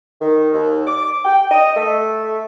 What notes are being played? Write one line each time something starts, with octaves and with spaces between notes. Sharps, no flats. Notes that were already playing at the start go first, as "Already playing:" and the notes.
D#3
D#2
D6
G5
D#5
A3